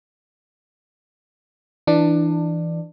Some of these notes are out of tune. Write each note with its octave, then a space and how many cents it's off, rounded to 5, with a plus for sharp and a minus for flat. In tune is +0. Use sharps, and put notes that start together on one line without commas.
E3 +0 D4 +15